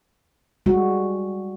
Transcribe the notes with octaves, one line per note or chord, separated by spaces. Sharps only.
G3 G#3 F#4